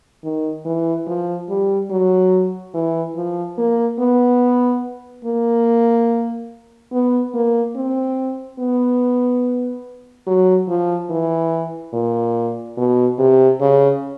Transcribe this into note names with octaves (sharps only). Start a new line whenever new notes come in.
D#3
E3
F3
G3
F#3
E3
F3
A#3
B3
A#3
B3
A#3
C4
B3
F#3
F3
E3
A#2
B2
C3
C#3